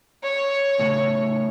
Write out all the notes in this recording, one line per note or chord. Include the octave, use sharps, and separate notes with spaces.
C#5
A2 C#3